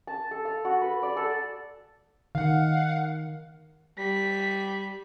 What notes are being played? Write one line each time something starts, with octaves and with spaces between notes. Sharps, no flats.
A5
A4
F5
F#4
B4
D5
A4
D#3 F5 F#5
G3 B6